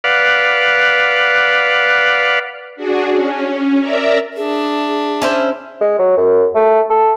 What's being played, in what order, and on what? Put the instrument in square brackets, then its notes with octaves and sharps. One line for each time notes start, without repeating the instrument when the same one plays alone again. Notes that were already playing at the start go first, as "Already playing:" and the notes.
[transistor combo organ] B4 D5 F5 F#5
[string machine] D4 F#4 G#4
C#4
A#4 D5 E5 A#5
[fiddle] D4 E5 [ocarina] G#4
[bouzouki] C#4 E4 C5
[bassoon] G#3
F#3
F#2
A3
A4